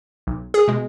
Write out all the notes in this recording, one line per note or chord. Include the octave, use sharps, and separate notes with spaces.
B1
G#4
B2 G#3